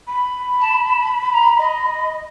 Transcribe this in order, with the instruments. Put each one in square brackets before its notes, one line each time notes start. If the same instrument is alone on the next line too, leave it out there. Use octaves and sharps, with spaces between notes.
[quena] B5
[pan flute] A5
A#5
D#5